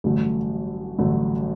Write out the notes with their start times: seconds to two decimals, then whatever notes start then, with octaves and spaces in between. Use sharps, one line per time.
0.04 A1 G2 D3 F#3 A3
0.98 A1 G2 D3 F#3 A3